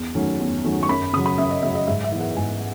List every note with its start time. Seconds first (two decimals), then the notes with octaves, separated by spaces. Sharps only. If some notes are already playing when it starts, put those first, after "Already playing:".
Already playing: E2 G#6
0.15 D#3 F#3 A3 C#4
0.39 E2
0.64 D#3 F#3 A3 C#4
0.83 C#6
0.89 F#2 B5
1.13 C#3 D#6
1.17 F#3
1.26 B5
1.38 F#2 E5
1.51 D#5
1.63 C#3 F#3 E5
1.75 D#5
1.87 G#2 E5
2.04 E5
2.12 E3 B3
2.20 F#5
2.37 G#2 G#5